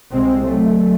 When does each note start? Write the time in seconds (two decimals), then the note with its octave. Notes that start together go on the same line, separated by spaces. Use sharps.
0.12 C2 C3 G#3 C4
0.46 F#3 A3